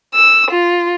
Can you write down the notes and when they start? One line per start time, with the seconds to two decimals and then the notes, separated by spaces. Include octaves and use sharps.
0.15 E6
0.51 F4